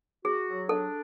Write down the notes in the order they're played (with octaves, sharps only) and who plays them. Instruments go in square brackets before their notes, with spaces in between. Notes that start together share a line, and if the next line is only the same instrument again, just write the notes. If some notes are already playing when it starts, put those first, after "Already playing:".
[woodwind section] F#4 [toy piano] G#4
[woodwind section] F#3
[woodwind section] D4 [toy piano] A4